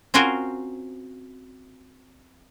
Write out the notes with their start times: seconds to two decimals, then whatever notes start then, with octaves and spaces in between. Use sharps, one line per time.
0.14 C4 C#4 F4 F#4 A#4 C5